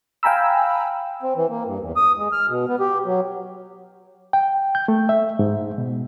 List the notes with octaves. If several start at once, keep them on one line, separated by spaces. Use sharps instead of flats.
F5 G5 G#5 A#5 B5 E6
C4
E3
A#3
G2
E2
D#6
G#3
F6
B2
B3
G4
F#3
G5
G6
A3
E5
G#2
B2